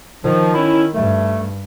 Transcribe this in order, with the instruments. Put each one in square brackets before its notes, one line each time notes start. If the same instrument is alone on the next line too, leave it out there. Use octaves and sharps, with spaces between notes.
[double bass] D#3 [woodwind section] F3
[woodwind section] C#4 E4
[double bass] G2 [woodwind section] A3